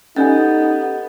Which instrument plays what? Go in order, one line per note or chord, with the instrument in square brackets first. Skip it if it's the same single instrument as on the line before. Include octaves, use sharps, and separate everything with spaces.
[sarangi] B3 [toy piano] C#4 D5 G#5 [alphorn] D#4 [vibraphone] G4 A4